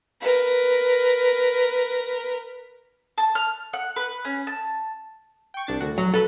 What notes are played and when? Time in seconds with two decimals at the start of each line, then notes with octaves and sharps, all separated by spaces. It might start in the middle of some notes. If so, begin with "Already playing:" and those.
0.20 A#4 B4
3.18 A5
3.35 F6
3.73 F#5
3.96 B4
4.25 C#4
4.47 A5
5.54 G5 C#6
5.67 C2 D4 A6
5.81 D2 F#4
5.98 F#3
6.14 A4 B4 F#6